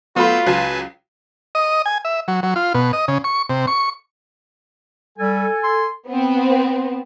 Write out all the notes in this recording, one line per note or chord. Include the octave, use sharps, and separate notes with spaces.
F#3 A3 B3 F4 B4 E6 G6
C#2 F#3 B4 G#5 A5
D#5
G#5
E5
F#3
F#3
F4
B2
D#5
C#3
C#6
C3
C#6
G3 A4 G#5
C6
B3 C4